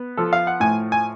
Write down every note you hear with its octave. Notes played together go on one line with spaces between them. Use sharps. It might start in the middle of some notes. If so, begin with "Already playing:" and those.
Already playing: B3
F3 A4
F5
F#5
A2 G#5
G#5